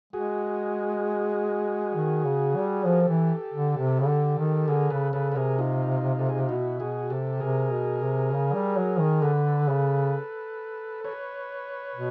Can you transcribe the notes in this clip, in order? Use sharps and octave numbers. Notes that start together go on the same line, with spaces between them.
G#3 F#4 G#4
D#3
C#3
G3
F3 A4
A#4
G4 A4
E3
D3
C3
C#3
D3
D#3
D3 G#4 A#4
C#3 A4 B4
C#3 A4 B4
B4
C3 G#4 A#4
D#4 F4
A4
G#4
G4
B2 E4 F#4
B2 F#4 G#4
C3 G4 A4
C3 G#4 A#4
B2
C3
C#3
G3
F#3
D#3
D3 A4 B4
C#3
B4 C#5
B2